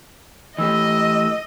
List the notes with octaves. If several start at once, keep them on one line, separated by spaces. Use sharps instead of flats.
E3 A3 G4 D#5 E6